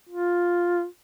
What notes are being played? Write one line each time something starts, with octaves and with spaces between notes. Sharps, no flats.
F4